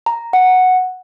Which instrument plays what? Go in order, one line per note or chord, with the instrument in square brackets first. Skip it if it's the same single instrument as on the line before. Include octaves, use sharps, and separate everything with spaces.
[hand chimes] A#5
F#5